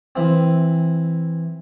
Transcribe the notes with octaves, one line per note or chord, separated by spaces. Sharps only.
E3 C4